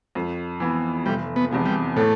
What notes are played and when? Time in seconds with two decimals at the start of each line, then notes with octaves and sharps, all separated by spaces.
0.15 F2
0.60 E3 B3
1.06 F1 G3
1.36 B3
1.51 E2 C3 F3 B3
1.66 G3
1.96 A2 A3